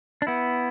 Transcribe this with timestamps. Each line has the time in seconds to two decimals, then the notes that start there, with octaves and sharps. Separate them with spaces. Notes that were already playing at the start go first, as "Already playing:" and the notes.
0.22 D4
0.27 B3 E4